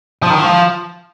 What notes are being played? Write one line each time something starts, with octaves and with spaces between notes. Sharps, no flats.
F3
D#3
F3